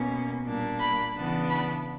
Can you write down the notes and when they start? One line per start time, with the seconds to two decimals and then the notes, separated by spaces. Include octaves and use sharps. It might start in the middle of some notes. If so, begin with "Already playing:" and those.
Already playing: B2 A#3 C#4
0.46 A#2 G3 A#3 D4
0.80 B5
1.15 C#3 E3 B3 D4
1.49 B5